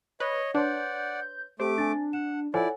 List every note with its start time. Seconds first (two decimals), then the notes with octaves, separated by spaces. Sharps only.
0.20 B4 C#5 D#5
0.54 D4 B4 C#5 D5 F#5 C6 G6
1.60 A3 C4 G4 D6
1.78 D4 G#5 A6
2.13 F#5 E7
2.54 F3 E4 A4 C#5 D5 F#5 G#5